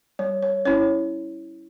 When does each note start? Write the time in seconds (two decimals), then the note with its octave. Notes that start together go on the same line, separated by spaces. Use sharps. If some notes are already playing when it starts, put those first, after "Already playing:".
0.19 G3 C#5
0.43 C#5
0.65 C#4 E4 C#5